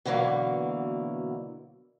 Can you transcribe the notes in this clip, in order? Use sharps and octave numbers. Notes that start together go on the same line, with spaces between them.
B2 D3 E3 F#3 A#3